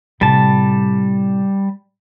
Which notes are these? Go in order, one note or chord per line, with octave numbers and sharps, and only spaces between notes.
A2 C3 G3 A5